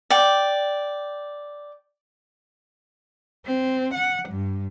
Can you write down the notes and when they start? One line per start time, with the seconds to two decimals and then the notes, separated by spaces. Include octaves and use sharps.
0.10 D5 G5
3.46 C4
3.94 F#5
4.29 G2